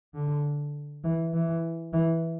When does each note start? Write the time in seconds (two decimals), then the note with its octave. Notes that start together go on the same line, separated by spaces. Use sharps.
0.14 D3
1.04 E3
1.34 E3
1.93 E3